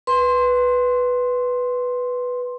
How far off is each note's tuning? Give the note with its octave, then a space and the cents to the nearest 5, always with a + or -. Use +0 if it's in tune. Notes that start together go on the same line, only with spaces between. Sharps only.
B4 +0 C6 +5